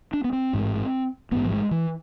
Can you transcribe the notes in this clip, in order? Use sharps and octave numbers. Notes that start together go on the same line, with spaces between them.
D4
B3
C4
A1 G#2
A1 G#2 B3
F3
G#3
E3